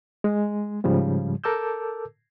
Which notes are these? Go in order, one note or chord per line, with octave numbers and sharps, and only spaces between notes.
G#3
G#2 C#3 F3 G3
A4 A#4 A5 D6 E6 G6